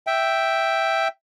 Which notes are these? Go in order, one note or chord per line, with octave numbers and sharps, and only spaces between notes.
E5 G5